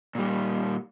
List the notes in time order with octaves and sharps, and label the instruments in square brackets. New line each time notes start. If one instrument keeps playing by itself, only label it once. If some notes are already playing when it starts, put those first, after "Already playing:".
[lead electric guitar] A#2 G3